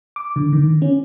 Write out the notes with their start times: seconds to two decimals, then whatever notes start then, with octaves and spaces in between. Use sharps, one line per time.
0.16 D6
0.36 D3
0.53 D#3
0.82 C#4